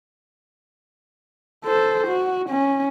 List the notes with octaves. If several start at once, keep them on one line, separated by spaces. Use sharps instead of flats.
A4 C5
F#4
C#4